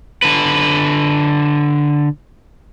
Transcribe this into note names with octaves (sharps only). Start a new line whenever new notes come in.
D3 B4